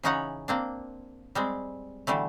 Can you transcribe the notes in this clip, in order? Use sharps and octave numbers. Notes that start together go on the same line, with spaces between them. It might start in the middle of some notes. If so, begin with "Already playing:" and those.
C#3 E3 C#4 D#4 C#5 F#5
A#3 C4 D4
G3 G#3 C4
B2 D3 E3 G3 A3